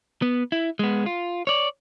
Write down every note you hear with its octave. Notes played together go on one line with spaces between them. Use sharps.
B3
E4
G#3 B3
F4
C#5 D5